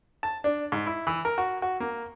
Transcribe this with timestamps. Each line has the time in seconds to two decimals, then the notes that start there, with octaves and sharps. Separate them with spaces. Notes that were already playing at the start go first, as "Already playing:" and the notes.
0.23 A5
0.44 D4
0.72 G#2
0.87 E4
1.07 E3
1.25 A#4
1.38 F#4
1.62 F#4
1.80 A#3